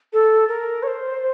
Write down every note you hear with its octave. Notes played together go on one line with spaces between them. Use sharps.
A4
A#4
C#5
C5